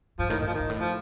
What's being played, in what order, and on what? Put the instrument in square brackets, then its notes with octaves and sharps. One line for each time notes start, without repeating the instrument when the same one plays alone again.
[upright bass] G2 [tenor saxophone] F3
[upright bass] A2 [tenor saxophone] D#3
[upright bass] A2 [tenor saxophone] D#3
[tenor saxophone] F3
D#3
[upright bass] G2
A2
[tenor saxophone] F3